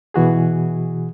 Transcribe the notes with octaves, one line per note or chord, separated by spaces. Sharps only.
B2 E3 F#4 G#4